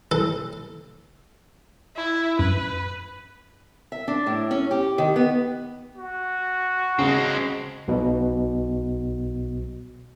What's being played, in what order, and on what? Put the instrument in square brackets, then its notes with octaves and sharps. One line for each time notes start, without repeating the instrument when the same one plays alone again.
[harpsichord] A4
[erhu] E4
[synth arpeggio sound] F#2 [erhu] B4
[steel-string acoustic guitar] E5
D4
A2
C#4
G4
D#3
B3
[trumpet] F#4
[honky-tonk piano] C#3 [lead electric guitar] G#3 C4
[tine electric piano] B1 B2